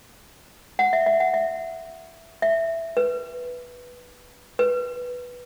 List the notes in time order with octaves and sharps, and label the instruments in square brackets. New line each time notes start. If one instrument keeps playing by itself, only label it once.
[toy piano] F#5
E5
E5
F#5
E5
E5
B4
B4